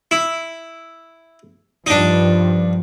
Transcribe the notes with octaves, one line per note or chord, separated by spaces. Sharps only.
E4
G2 F3 D4 D#4